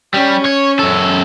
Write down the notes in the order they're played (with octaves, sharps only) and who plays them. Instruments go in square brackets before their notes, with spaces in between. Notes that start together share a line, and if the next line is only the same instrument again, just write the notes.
[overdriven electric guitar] G3 [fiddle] C#4
[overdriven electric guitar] C#5
F#2 A4